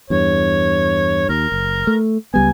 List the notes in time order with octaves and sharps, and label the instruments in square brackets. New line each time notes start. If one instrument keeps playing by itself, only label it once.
[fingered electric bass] E2 G2 [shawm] C#5
[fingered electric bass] D#2 [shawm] A#4
[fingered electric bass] F#1
A3
[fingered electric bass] C#2 G3 B3 [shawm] G#5